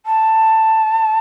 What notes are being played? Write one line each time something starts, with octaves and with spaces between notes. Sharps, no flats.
A5